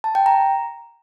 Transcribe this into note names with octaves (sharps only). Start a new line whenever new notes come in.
A5
G5
A#5